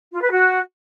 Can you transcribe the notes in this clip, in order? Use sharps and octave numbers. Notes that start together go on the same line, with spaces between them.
F4
B4
F#4